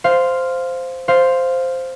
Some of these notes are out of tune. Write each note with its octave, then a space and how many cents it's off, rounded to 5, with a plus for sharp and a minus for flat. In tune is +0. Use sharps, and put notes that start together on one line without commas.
C5 -5 F5 +0
C5 +0 F5 +0